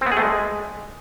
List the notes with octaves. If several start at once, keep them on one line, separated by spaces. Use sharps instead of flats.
C4
B3
G#4
A3
G#3